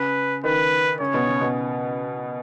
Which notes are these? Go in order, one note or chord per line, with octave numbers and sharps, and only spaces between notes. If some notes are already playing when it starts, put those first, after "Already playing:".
Already playing: C#3 B4
D#3 B4
C#3 C#5
B2
C#3
B2